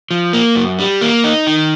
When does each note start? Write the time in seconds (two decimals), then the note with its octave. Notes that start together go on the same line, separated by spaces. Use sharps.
0.11 F3
0.33 A#3
0.55 F#2
0.79 G3
1.01 A#3
1.24 D#4
1.47 D#3